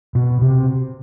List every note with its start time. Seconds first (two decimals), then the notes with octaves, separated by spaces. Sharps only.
0.15 B2
0.41 C3